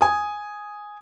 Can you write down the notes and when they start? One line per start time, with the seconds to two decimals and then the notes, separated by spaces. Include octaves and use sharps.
0.01 G#5 D#6